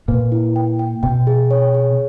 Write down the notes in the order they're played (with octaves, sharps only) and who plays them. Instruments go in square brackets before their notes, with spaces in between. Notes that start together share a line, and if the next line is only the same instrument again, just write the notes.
[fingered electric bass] A#2 [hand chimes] B4
[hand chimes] E4
G5
G5
[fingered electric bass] B2 [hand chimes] G5
[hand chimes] G#4
C#5
G#4